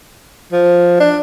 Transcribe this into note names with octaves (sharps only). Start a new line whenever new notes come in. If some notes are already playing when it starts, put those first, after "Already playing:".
F3
D4